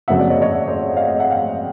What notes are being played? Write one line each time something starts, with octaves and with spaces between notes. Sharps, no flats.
F#1 F2 C#3 F#3 E5 F#5
D5 E5
C#5 D#5
C#5 D#5
D5 E5
C5 D5
D#5 F5
D#5 F5
E5 F#5
F5 G5